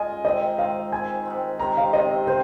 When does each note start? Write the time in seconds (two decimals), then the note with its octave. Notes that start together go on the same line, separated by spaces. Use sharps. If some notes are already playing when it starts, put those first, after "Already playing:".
Already playing: G#3 F4 D#5 G#5
0.25 G#2 D#3 C4 D#5
0.58 G#2 D#3 C4 F5
0.92 G#2 D#3 C4 G#5
1.25 G#2 D#3 C4
1.59 C3 D#3 C4 A#5
1.77 F5
1.93 C3 D#3 C4 D#5
2.27 C3 D#3 C4 C5